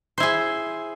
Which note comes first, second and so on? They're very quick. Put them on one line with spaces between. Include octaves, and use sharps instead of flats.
C5 E4 G#4